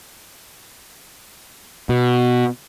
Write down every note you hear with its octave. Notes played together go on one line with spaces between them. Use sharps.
B2